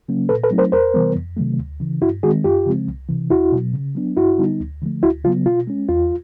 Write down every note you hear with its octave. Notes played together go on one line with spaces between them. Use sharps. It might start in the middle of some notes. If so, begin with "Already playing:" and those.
C#3 F#3 A#3 C#4
A#2 A4 B4
A4 B4
F#3 A3 C4 D#4
A#4 C5
E2 A#4 C5
C3 E3 G3 B3
F2
C3 D#3 F#3 A3
D2
C#3 E3
G2 E4 F#4
D#3 G#3 C4 F#4 G#4
F#2 F4 G4
C#3 F3 G#3 C4
C2
C3 E3
E2 E4 F#4
B2 F#3
C#3
F#3 B3 D4
G2 E4 F#4
D3 G3 B3 D#4
D2
D3 F3 A3
D2 E4 F#4
C#3 F#3 B3 F4
B2 F4
G#3 C#4
E2 F4